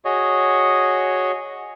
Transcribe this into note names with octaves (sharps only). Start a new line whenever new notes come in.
F#4 G#4 C#5 D#5